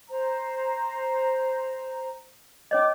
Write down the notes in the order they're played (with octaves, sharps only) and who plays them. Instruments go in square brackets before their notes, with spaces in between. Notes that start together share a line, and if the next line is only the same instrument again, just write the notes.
[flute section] C5 A#5
[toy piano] C#4 C#5 D#5 [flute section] D6